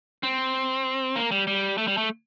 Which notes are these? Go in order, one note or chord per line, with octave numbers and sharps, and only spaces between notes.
C4
A#3
G3
G3
A3
G3
A3